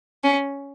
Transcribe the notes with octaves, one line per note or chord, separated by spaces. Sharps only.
C#4